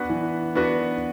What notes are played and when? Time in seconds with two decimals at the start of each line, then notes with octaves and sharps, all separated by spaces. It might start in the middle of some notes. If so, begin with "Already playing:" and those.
Already playing: B3 D4 F#4 B4
0.10 E3
0.55 B3 D4 F#4 B4